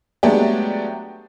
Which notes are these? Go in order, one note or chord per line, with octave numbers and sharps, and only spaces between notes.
F#3 G#3 A3 B3 D4 G4